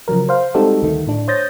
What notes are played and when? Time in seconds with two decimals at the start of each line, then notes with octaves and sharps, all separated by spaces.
0.08 C#3 F3 F#3 A#4
0.29 C5 F5
0.54 G3 G#3 C4 D#4 F#4 A4
0.83 D2 D#3 A3
1.07 A2 D4
1.28 C5 C#5 D#6 G6 A6 A#6